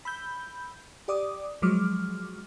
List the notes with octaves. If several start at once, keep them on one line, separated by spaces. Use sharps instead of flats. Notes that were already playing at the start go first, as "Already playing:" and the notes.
B5 E6 G6
G4 D5 D6 D#6
F3 F#3 G#3 D6 F6